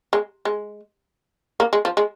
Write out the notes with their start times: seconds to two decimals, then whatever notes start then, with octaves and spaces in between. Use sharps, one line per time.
0.13 G#3
0.45 G#3
1.60 A#3
1.73 G#3
1.85 F3
1.97 G#3